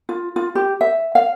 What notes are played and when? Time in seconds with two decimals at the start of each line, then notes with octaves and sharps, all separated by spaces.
0.09 F4
0.36 F4
0.55 G4
0.81 E5
1.15 F5